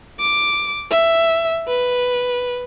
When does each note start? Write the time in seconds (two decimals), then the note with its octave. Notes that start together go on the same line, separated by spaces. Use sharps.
0.20 D6
0.91 E5
1.68 B4